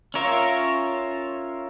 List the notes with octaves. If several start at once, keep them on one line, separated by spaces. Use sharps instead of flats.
C#4 F4 A#4 C#5 E5